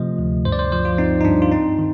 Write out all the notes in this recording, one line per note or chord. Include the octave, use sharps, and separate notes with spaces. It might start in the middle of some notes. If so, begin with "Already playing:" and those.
Already playing: C3 F3 A3 D#5
D2
G2 C5
D5
C5
F3 C5
F4
C4 D#4
D#4
G2 D4
F4
C4 D#4
D#3